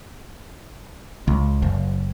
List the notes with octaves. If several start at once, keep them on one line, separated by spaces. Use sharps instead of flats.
C#2
F#1